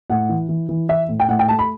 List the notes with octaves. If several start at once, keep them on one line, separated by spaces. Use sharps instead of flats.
A2 F#5
E3
E3
E3
E3 E5
A2
G5
A2 F#5
G5
A3 A5
B5